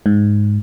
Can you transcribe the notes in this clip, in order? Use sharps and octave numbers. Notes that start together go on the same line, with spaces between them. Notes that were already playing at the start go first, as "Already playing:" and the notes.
G#2